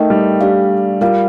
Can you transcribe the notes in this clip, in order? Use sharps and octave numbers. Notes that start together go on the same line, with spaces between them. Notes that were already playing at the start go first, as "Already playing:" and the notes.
Already playing: A3 D#4 A#4 D#5 G5
G3
D4 G4 D5 F5
G3 F4 A#4 F5